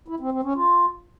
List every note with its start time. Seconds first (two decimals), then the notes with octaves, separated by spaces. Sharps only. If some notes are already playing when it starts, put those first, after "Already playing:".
0.08 E4
0.20 C4
0.32 C4
0.43 C#4
0.55 F4